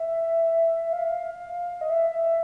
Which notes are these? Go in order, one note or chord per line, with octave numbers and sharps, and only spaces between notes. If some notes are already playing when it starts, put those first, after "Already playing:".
Already playing: E5
F5
D#5
E5